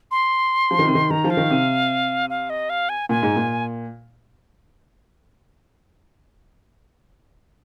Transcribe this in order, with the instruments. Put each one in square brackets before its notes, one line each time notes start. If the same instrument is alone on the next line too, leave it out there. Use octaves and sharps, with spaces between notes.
[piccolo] C6
[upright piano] F3
D#3
C3
D#3
[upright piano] D#3 [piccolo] A#5
[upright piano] F3
[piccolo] F5
[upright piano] D#3
C3
[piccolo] F5
D#5
F5
G#5
[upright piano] A#2 [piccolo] G#5
[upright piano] G#2
A#2